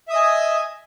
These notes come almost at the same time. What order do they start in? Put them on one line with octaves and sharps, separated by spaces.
E5 D#6 D#5 G#5